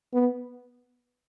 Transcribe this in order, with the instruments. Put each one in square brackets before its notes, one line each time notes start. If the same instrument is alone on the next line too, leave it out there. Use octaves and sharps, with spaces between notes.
[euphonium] B3